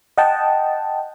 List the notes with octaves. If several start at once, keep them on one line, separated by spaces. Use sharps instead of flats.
D#5 F#5 G5 A5